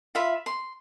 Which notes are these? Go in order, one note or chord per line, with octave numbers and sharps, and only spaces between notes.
F4 E5 B5
C6